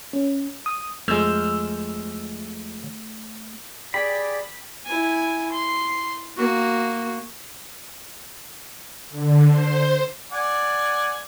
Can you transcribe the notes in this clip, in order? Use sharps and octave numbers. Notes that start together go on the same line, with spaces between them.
C#4
D#6
F2 G#3 A3 E6 F6 G6
G4 G#4 D5 G5 B5
E4 G#5
C6
A#3 F#4
D3
C5
D5 F#5 G#5